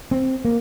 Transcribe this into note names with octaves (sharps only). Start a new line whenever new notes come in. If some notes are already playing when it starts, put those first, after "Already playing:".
C4
A#3